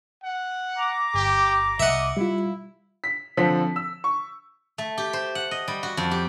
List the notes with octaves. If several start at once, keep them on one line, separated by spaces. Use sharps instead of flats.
F#5
A#5 D6
G1 G4
C2 D#5 E5 F#5
G3 E4 F4
B6
D3 F3 C4 A4 B6
E6
C#6
A3
G4
C5
F#5
D#5
G3
F#4
F2
G4